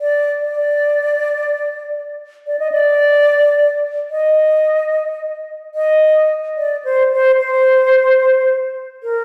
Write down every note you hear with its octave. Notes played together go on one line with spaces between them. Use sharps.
D5
D5
D5
D#5
D5
D#5
D#5
D5
C5
C5
C5
A#4